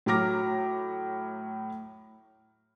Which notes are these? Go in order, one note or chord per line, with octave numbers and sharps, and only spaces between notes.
A2 F#3 A#5 D6 F6 A#6